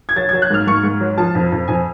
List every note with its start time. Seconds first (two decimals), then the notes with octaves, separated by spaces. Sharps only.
0.09 G#6
0.16 F#3 A6
0.29 G#6
0.33 F#3
0.42 F#6
0.50 G#2 F6
0.67 G#2 C#6
0.84 G#2
1.00 F#3
1.17 F3 A5
1.35 F2
1.52 F2
1.68 F2 G#5